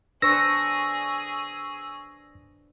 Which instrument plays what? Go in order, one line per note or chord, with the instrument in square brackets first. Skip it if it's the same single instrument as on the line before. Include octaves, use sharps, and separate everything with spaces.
[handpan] D4 B4 C5 [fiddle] G#4 [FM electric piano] C#6 E6 [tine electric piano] A#6